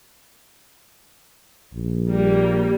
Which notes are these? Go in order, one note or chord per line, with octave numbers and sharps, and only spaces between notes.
A#1
G3 A#3